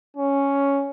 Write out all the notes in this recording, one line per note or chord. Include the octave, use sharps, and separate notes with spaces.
C#4